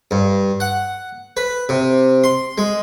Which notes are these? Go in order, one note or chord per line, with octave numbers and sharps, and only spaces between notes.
G2
F#5
B4
C3
C6
G#3